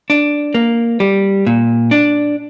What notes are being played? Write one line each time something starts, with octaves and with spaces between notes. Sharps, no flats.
D4
A#3
G3
A#2
D4